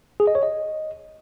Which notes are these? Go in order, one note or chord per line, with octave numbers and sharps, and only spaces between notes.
G#4
D#5
C#5
D#5